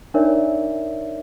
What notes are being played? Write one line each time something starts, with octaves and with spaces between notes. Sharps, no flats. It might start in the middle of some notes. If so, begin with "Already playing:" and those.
D4 D#4 A#4 C#5 D5 E5